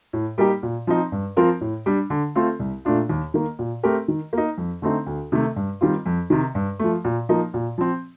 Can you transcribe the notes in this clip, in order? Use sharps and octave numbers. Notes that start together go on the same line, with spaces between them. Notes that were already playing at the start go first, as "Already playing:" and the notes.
A2
G3 A#3 D#4 G4
A#2
F3 C4 D#4
G2
F3 C4 F4 A#4
A2
G3 D4
D3
A3 C4 F4 A4
C2
A#2 A3 D4 F4
D#2
D#3 A#3
A#2
A3 C4 G4 A#4
D#3
A#3 D#4
F2
D3 A3 C4 D#4
D2
C3 D#3 A3
G2
D#3 G3 C4 F4
F2
C3 D#3
G2
F3 A3
A#2
F3 A#3 D#4
A#2
F3 C4